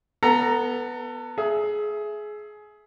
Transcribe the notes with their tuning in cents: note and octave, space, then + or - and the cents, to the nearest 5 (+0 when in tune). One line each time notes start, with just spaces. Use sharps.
B3 +0 A4 +30 A#5 +0
G#4 +20 E5 +10